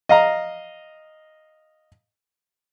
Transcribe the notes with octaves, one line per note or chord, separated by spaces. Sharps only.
D#5 F5 A#5